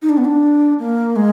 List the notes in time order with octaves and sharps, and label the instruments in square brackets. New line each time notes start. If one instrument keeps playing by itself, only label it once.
[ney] D#4
D4
B3
D4
A#3
G#3